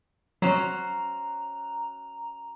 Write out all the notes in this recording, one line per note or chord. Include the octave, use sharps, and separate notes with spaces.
F#3 C#4 F#4 C5 A#5